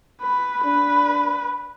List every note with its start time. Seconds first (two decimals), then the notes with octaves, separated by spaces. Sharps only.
0.22 B4
0.65 D4 B4